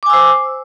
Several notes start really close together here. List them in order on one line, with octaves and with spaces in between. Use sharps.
D6 G#5 E6 C5